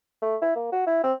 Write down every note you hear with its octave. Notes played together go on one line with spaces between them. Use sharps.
A3
E4
A#3
F#4
E4
C4